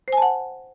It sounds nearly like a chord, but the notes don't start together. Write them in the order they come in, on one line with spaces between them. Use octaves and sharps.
C5 G#5 A5 F#5